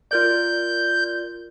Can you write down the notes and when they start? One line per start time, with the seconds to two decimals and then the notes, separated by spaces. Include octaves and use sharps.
0.11 F4 A#4 D5 G6